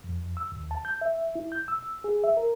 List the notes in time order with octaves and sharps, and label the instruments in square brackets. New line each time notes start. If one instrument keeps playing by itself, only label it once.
[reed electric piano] F2
E6
D#2
A5
G6
E5
E4
G6
E6
G#4
E5
A#4